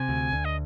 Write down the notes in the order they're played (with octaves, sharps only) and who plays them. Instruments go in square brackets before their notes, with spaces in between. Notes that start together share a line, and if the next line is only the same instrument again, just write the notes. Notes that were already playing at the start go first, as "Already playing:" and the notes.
Already playing: [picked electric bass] C3 [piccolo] G#5
[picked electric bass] D2
D2
[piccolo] D#5